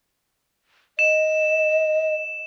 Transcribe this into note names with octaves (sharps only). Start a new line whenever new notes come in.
D#5 E7